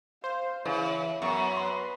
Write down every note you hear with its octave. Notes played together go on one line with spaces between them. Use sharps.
C5 F5
C#3 E3 E5
F#2 B3 C#6
B4 C6